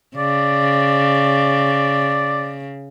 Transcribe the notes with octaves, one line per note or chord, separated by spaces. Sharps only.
C#3 D5